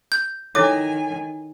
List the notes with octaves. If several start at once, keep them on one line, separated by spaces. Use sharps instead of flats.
G6
D#3 E4 A4 C#5 G#5 D6